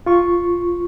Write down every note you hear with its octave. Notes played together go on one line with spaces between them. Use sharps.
F4 C#6